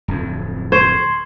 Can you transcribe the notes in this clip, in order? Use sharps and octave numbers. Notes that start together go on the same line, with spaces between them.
D1 F2
C5 C6 C#6 G#6